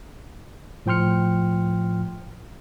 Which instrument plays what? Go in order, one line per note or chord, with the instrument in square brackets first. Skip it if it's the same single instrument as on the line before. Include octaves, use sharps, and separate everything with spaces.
[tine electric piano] A2 F3 G5 C6 F6 C#7